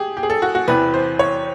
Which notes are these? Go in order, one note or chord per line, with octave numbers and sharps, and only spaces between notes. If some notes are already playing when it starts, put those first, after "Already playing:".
Already playing: G4 G#4
G4
G#4
A4
F#4
F#4
E2 C3 E3 B4
C5
C#5